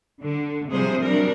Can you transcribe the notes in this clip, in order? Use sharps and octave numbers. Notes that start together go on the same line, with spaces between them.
D3
C3 F3 G3 G#4 C5
F#3 G3 D4 A#4